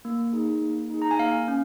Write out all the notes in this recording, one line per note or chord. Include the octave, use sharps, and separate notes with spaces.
A#3
D#4 G#4
A#3
D#4 G#4
A#5
G#5
A#3 F5
C#4